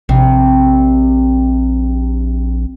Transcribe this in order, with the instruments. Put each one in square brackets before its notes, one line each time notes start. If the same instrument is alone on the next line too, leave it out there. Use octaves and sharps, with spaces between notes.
[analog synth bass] A#1 [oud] C3